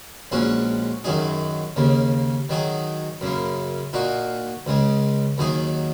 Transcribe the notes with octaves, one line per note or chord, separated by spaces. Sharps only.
A#1 A#2 G#3 C#4 F#4
F#2 D#3 F#3 D#4 G#4
D#2 C#3 A#3
D#3 F#3 D#4 G#4
F#2 C#3 A#3
A#2 A#3 D#4 F#4
C#2 C#3 G#3
D#2 D#3 F#3 D#4 G#4